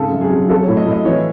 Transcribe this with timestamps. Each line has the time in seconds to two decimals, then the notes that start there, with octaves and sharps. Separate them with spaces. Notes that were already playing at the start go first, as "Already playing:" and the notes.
Already playing: G#2 C#3 A4
0.12 F#2
0.21 G#4
0.30 F#3
0.49 F#3 A4
0.63 A2 C#5
0.77 D#5
0.86 A2
0.91 D#5
1.05 E3 C#5